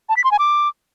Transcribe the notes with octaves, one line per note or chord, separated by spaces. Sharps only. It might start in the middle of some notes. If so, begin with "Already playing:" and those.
A5
B6
C6
G#5
D6